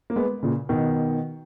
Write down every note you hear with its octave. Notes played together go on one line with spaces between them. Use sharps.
A#3
G#3 B3
A#2 C#3
B2 D#3